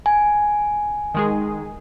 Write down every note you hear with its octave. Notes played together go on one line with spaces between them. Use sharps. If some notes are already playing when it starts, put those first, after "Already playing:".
G#5
D#3 G#3 G#4